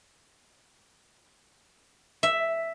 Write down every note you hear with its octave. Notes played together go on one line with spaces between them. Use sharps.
E5